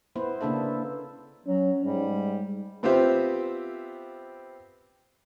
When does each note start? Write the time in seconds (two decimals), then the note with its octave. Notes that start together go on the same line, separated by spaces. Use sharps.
0.16 B3 E4 B4 C5
0.41 C#3 A#3 D4 A4 E5
1.46 F#3 C#4
1.85 G#2 G3
2.83 B3 C4 F4 G4 C5 E5